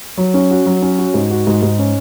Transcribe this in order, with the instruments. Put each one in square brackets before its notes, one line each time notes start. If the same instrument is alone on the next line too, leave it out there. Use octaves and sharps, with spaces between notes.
[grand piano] F#3
C#4
F#4
F#3
C#4
F#4
G#2
F#4
G#2
G#2
C#4